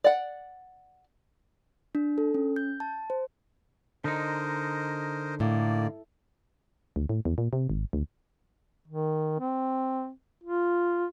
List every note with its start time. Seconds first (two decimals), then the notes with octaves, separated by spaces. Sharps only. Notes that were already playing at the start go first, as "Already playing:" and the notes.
0.04 D5 F#5
1.95 D4
2.18 A4
2.34 C#4
2.56 G6
2.80 A5
3.10 C5
4.04 D3 D#4 A#4 C5 D#5
5.40 A2 A#3 D5
6.96 D2
7.09 A2
7.25 E2
7.38 A#2
7.53 C3
7.70 G#1
7.93 D2
8.88 D#3
9.40 C4
10.44 F4